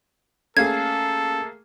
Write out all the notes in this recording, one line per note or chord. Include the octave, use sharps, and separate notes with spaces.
A3 A#3 C#4 G#4 A4 F5 G#6